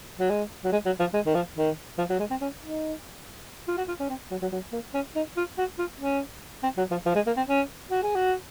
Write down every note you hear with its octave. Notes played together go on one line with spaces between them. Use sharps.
F#3
G#3
F#3
G#3
F#3
F3
G#3
D#3
F3
D#3
F3
F#3
G#3
C4
C#4
D#4
F4
F#4
F4
C#4
C4
F#3
F#3
F#3
A#3
C#4
D#4
F4
F#4
F4
C#4
C4
F#3
F3
F3
G#3
A#3
C4
C#4
F#4
G#4
F#4